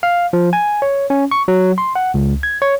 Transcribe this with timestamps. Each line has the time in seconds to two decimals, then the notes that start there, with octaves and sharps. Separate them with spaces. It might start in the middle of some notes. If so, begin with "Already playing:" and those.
0.03 F5
0.33 F3
0.53 G#5
0.82 C#5
1.10 C#4
1.31 C#6
1.48 F#3
1.78 C6
1.96 F#5
2.14 C#2
2.43 G#6
2.62 C#5